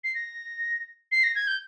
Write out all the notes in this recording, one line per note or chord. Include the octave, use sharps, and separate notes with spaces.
C7
A#6
C7
A#6
G#6
G6